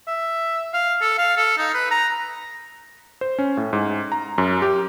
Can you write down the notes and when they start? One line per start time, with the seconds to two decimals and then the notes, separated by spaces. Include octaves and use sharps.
0.07 E5
0.74 F5
1.01 A4
1.18 F5
1.37 A4
1.57 D#4
1.74 B4
1.91 A#5
3.21 C5
3.39 C#4
3.57 A2
3.73 G#2
4.12 A#5
4.38 F#2
4.62 G4